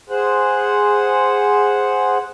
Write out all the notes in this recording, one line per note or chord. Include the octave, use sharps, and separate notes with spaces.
G#4 C5 F#5